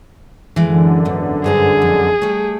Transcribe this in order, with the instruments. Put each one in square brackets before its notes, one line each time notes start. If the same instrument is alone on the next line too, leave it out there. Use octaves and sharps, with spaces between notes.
[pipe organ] F#2 D3 [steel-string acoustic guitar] E3 G#3
[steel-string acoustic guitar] E2 G#2
[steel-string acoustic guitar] G2 C5 A#5 [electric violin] G#4
[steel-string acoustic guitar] F2
G3 A3